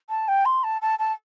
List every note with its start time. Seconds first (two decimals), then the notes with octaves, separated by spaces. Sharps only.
0.09 A5
0.28 G5
0.45 C6
0.63 A5
0.81 A5
0.99 A5